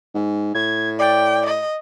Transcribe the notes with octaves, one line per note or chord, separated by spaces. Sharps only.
G#2
A2 G#6
D5 G5
D#5